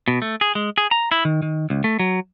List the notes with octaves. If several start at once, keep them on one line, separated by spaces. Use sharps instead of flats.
B2
A3
G#4
G#3
G#4
A#5
E4
D#3
D#3
C#2
A3
F#3